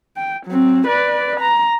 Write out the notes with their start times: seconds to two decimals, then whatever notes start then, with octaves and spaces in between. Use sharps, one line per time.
0.17 G5
0.46 F#3 C4
0.87 B4 D5
1.40 A#5